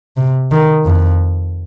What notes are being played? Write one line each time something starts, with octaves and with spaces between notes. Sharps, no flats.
C3
D#3
F2